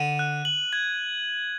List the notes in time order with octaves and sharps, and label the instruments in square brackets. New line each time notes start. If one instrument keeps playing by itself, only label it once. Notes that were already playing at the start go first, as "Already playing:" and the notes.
Already playing: [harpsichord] D3 [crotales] D#7
[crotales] F#6
F#7
G#6